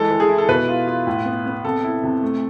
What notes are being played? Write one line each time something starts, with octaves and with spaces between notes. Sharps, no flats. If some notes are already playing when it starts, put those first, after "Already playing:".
Already playing: E3 G#3 A4
E3
G#4
E4
A4
B2 B4
F4
F4
A2
B3
B3
C3 A4
E4
C3
A3